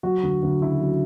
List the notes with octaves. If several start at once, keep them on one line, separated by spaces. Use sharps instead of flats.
F#3 F#4
D2
D2
C#3 E4
F#3